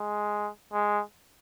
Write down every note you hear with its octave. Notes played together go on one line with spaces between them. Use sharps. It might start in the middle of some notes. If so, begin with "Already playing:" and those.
Already playing: G#3
G#3